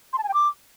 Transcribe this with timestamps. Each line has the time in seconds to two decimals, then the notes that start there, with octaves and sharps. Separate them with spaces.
0.13 C6
0.18 A5
0.23 G#5
0.29 G5
0.34 D6